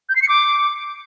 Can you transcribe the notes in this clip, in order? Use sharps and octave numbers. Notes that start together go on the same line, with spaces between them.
G6
C7
C#7
D6